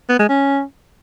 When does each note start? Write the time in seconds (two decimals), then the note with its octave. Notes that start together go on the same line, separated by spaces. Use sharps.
0.09 B3
0.19 G#3
0.29 C#4